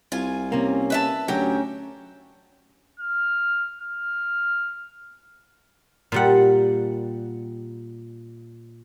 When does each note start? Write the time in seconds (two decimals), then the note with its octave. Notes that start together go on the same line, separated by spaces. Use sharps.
0.12 C2 F4 G#5
0.52 C3 A#3 C#4
0.90 B4 E5 A5
1.28 D2 F#3 C#4 G4 A#4
3.00 F6
3.81 F6
6.12 A#2 G3 F#5